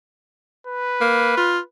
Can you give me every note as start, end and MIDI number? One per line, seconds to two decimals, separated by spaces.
0.67 1.66 71
1.01 1.37 58
1.37 1.58 65